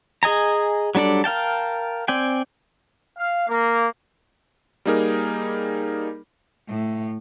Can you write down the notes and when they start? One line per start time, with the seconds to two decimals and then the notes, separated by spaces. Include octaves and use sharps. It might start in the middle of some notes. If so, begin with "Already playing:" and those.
0.23 G#4 D#5 G#5 A#5
0.95 F#3 G3 D4 A4 D5
1.24 A#4 F5 G5 A5
2.08 C4 D5 G5 G#5
3.17 F5
3.48 A#3
4.85 G3 A#3 D#4 G#4 A#4
6.68 A2